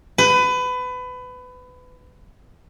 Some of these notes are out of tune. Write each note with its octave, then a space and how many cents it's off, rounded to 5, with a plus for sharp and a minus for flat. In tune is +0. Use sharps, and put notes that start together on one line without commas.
B4 +25